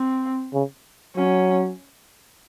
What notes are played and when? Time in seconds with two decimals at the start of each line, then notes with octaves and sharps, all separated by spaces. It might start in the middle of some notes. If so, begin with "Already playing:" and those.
Already playing: C4
0.53 C#3
1.16 F#3 C#4